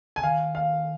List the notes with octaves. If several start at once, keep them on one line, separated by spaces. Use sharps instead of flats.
C#3 G#5
D#3 F5
F5